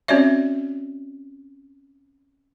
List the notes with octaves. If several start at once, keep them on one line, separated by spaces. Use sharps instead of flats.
C4 C#4 F#4 C#5 D5 E5